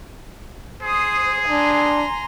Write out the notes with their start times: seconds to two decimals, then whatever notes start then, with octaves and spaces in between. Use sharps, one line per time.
0.83 G#4 C5 D#6
1.49 D4 G#5 A#5 C6